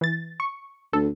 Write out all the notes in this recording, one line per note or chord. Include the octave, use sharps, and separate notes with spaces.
E3 A6
C#6
D2 A4